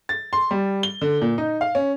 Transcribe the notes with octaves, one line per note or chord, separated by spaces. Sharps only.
A6
C6
G3
G7
D3
A#2
D#4
F5
C#4